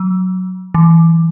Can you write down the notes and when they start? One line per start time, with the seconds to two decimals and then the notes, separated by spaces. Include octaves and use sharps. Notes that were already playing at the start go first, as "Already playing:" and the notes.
Already playing: F#3
0.74 E3